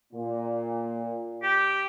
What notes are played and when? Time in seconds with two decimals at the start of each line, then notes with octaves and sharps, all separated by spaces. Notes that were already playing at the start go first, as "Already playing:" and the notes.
0.13 A#2
1.43 G4